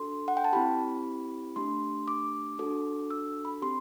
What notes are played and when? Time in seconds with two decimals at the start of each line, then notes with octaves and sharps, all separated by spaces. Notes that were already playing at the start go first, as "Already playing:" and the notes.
Already playing: D4 F#4 A4 C6
0.28 F#5
0.37 G5
0.44 A5
0.53 C4 E4 G4 B5
1.56 A3 D4 G4 C6
2.08 D6
2.59 D4 F#4 A4
3.11 E6
3.45 B5
3.62 C4 G4 C6